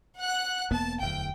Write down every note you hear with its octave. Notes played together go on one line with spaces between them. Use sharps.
F#5 F#6
E1 A#3 B3 A5
D1 E2 G5